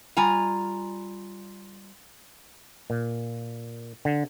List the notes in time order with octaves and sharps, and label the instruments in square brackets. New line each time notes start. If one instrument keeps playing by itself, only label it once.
[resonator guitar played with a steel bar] G3 F4 G#5 A#5
[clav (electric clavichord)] A#2
D3